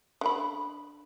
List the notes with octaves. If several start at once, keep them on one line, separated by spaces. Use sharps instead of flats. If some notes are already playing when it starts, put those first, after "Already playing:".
D3 G5 B5